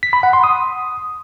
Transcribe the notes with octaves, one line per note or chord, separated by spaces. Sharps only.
B6
B5
F#5
C6
D#6